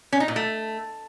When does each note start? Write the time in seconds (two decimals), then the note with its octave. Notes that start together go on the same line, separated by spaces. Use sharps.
0.12 C#4
0.20 D#4
0.28 A#2
0.36 A3